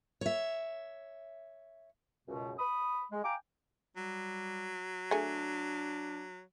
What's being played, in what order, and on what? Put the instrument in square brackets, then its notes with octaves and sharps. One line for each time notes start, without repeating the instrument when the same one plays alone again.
[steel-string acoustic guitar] C#5 E5
[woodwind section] C#2 F#2 B2
B5 D#6
G#3
F5 G5 G#5 A#5 D6
[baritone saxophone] F#3 [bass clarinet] G3
[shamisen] A3 G#4 [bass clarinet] D4